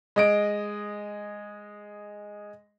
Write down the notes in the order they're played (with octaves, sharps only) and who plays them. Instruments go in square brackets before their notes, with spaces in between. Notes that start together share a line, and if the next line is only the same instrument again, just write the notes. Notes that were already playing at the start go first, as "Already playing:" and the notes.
[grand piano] G#3 D#5 D7